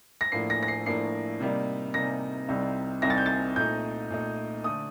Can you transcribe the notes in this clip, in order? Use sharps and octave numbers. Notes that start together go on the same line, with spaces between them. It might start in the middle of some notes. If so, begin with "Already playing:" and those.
A#6
A2 F3 A#3 D4 C7
A#6
A#6
C7
A2 F3 A#3 D4 C7
C3 G3 A#3 D#4
C3 G3 A#3 D#4 A#6
C2 C3 G3 C4 D#4
C2 C3 G3 C4 D#4 A#6
A6
G6
A6
A#2 A3 D#4 G6
A#2 A3 D#4
D3 A3 D#6